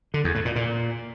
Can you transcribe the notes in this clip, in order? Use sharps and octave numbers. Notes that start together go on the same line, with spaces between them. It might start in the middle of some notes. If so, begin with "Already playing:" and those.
D3
E2
A2
A#2
A#2